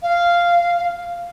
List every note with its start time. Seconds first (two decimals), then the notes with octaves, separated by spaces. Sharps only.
0.03 F5